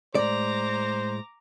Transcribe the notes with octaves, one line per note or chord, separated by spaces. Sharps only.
A2 G#3 C5 D5 A#5 D6